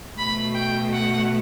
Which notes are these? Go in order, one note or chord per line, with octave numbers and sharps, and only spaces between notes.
B2 A3 B5
G5
F#5